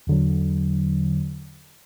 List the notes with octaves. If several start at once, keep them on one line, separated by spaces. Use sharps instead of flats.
E2 D3 F#3